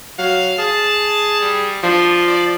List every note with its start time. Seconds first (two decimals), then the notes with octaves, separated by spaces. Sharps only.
0.19 F#3 F5
0.59 G#4 A5
1.41 G3
1.83 F3 D4
2.27 D5